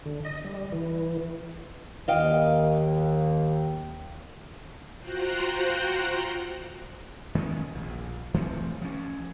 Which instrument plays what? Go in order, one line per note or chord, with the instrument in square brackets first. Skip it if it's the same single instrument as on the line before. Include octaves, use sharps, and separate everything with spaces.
[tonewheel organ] D3
D#5
G3
E3
[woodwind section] D#2 D#3 [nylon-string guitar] D#5 F5 G5
[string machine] F4 F#4 C5 F#5 G5 A#5
[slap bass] D#3 G#3 B3 C#4
A#1
E3 A3 C4
F3 C#4